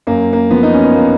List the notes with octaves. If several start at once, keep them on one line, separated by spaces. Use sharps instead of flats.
F#2 A#3
A#3
F3 B3
D#4
C#4
B3
A#3